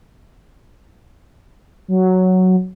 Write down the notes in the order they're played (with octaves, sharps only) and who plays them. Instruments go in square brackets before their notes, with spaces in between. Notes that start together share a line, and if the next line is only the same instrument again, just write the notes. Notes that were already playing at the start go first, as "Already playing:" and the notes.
[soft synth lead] F#3